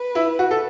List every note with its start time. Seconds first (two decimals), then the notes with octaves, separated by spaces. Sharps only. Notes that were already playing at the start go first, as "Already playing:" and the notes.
Already playing: B4
0.15 E4
0.39 F#4
0.51 A4